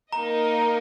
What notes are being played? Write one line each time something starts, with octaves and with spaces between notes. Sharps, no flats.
A#3 D#4 A#4 D#5 A#5